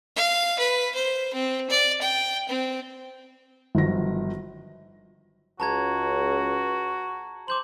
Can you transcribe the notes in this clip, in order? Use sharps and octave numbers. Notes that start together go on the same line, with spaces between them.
F5
B4
C5
C4
D5
G5
C4
G1 D#3 F3 F#3 A#6
C#2 F#4 A5 A#5 G#6
C5 D6 G6 F#7